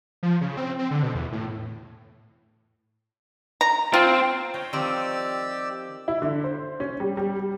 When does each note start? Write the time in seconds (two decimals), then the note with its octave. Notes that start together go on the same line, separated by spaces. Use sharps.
0.23 F3
0.41 C#3
0.57 C4
0.79 C4
0.91 D3
1.03 B2
1.15 E2
1.32 A2
3.61 A#5
3.94 C4 F4
4.54 D#4 C#5 G5
4.73 D#3 F3 C4 G4 D5 E6
6.08 E4
6.22 D3
6.44 C5
6.80 C#4
7.00 G3
7.17 G3
7.39 G3